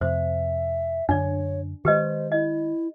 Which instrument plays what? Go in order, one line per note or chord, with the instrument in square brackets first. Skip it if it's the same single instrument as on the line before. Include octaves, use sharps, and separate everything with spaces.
[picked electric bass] F2 C3 [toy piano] C5 [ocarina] E5
[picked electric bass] F#2 D3 [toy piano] D4 D5 [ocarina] C#5
[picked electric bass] D#3 G#3 [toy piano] G4 B4 D#5 [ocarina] C5
[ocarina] E4 [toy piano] D#5